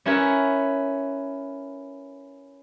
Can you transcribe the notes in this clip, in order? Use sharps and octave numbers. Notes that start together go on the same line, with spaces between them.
C#4 E4 A#4 B4 C#5